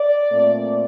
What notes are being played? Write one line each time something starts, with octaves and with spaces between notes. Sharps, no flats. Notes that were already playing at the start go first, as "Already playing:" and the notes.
Already playing: D5
A#2 A3 C4